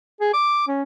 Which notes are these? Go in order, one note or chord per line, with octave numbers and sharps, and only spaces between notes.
G#4
D6
C#4